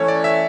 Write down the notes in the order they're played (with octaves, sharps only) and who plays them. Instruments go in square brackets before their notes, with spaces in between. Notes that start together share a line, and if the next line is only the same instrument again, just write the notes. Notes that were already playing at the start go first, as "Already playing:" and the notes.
Already playing: [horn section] E3 A3 C#4 [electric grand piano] C#5
[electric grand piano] D5
E5